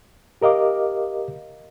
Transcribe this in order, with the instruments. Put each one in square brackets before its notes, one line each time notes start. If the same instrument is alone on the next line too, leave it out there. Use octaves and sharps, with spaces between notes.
[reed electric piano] G4 A#4 D#5 F5 D6